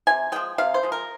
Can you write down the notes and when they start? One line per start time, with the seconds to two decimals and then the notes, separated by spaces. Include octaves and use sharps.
0.07 C3 G#5
0.32 F3 G#3 G5
0.58 C3 F5
0.74 C5
0.83 F3 G#3
0.92 A#4